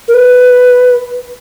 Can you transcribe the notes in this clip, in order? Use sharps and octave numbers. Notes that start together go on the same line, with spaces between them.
A#4
B4